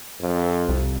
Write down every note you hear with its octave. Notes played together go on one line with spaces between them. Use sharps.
F2
C2